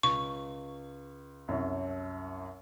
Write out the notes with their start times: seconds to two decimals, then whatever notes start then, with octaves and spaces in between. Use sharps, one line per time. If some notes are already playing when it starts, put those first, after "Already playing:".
0.03 C#2 C#6
1.48 C2 F#2 C#5